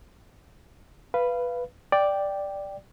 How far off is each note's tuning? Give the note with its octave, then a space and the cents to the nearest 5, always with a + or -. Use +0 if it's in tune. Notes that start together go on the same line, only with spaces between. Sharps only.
B4 +0 F5 -20
D5 +0 G5 +0